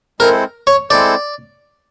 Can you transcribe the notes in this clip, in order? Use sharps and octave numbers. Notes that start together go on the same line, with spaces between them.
G#3 C4 E4 A4 A#4 C5
C#5
G#3 C4 E4 A4 C5 D5